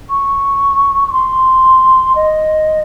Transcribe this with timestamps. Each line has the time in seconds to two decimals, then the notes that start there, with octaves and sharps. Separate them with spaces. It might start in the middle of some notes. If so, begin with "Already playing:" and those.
0.09 C#6
1.07 C#6
1.12 C6
2.15 D#5